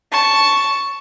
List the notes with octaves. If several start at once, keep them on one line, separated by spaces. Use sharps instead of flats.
A5 C#6